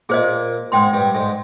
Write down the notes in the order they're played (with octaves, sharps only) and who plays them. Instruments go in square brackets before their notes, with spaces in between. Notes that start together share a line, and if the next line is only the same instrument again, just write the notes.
[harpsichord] A#2 A#3 [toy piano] G#4 C5 D#5
[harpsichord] G#2 G#3 [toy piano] C5 G5 C6
[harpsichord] G2 G3
G#2 G#3